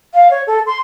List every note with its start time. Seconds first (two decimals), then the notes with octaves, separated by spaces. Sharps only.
0.14 F5
0.31 C#5
0.47 A4
0.66 C6